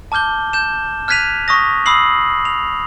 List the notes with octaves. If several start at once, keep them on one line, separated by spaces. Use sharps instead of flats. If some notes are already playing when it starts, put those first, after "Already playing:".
A5 D6 F6 G6 G7
G6 E7
F6 F#6 G#6 B6 D#7 F7
C#6 D#6 A#6
B5 D#6 E6 C7 F#7
F7